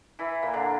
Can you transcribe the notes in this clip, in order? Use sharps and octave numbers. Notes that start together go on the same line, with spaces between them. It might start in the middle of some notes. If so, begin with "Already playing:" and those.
E3 E4
A#2 A#3
D3 D4